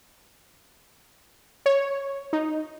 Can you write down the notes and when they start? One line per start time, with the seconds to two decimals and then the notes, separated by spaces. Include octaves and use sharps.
1.66 C#5
2.33 D#4